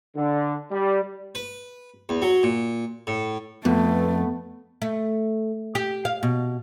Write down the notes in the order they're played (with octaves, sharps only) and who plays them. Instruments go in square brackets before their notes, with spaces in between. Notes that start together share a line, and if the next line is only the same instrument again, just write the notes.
[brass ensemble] D3
G3
[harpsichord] B4
E2
F#3
A#2
A2
[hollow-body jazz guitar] F2 [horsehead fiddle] A3 [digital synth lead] B3
[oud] A3
G4
F5
B2